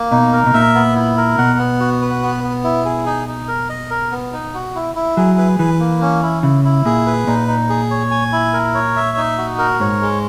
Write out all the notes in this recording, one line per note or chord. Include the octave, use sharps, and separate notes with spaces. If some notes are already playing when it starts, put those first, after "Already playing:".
Already playing: A#3
B2 D#4
A#4
B2
A#2 E5
B3
E4
A#4
B2 F#5
B3
F#4
B4
B3
B3
E4
G#4
D#4
D#4
A#4
D#5
A#4
B3
D#4
F#4
E4
E4
F#3 G#4
B4
E3 B4
A#3
C#4
E4
C#3 E4
E4
A#2 G#4
B4
A#2 D#4
D#4
G#4
C#5
G#5
E4
A#4
C#5
E5
D#4
F#4
A#4
G#2 C#5
G#3